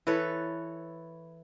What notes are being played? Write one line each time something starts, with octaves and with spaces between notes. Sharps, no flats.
E3 A4 B4 C#5